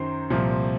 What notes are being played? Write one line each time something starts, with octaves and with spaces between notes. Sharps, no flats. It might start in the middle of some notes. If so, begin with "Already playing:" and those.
Already playing: F#2 D#3 F#3 C5 C6
C2 A#2 F3